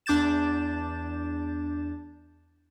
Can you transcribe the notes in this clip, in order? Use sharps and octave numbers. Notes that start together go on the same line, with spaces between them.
E2 D4 D6 G6 A6 E7